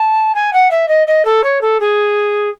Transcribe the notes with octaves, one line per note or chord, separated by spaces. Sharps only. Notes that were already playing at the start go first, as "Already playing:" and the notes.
Already playing: A5
G#5
F#5
E5
D#5
D#5
A4
C#5
A4
G#4